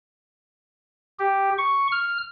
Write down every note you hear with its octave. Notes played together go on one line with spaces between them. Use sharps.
G4
C#6
F6